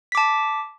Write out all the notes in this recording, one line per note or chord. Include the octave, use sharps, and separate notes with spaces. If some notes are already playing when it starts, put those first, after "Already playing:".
A5 D6 B6